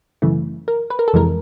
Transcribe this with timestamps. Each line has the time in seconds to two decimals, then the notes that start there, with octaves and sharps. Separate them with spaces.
0.22 F#2 C#3 E3 A3
0.68 A#4
0.90 B4
0.99 A#4
1.08 A4
1.13 F2 C3 E3 G#3 A#4